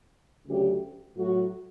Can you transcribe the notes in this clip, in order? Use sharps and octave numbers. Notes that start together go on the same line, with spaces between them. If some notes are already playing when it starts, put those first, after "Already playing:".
D2 C#3 F#3 G4
A2 F#3 F#4